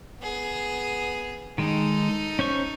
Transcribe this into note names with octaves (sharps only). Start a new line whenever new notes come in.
B3 G#4
D#3 G#3 D#4 A4
C#4 C5 C#6